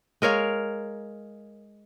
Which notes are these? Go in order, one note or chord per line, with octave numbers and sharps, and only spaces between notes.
G#3 A#4 C#5 F5